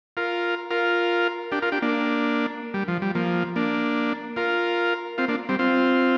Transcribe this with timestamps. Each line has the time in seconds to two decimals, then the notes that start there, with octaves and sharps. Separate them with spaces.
0.17 F4 A#4
0.71 F4 A#4
1.52 D4 G4
1.62 F4 A#4
1.72 D4 G4
1.82 A#3 D4
2.74 G3
2.88 F3
3.02 G3
3.15 F3 A#3
3.56 A#3 D4
4.36 F4 A#4
5.18 C4 F4
5.28 A#3 D4
5.49 G3 C4
5.59 C4 F4